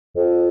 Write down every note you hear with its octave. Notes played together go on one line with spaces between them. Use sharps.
F2